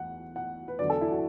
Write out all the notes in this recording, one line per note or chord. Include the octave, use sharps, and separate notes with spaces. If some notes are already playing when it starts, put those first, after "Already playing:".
Already playing: E2 E3 F#5
F#5
B4
E2 D3 F#3 D5
A4
E4
F#4